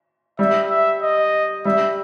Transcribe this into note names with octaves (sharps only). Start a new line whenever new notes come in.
G3 E5
E5
D#5
G3 E5